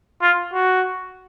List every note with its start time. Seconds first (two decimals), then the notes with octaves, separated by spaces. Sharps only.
0.22 F4
0.53 F#4